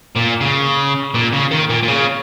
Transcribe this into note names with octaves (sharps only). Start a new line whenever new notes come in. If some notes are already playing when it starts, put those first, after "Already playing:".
A#2
C#3
A#2
C#3
D#3
A#2
A#2
C#3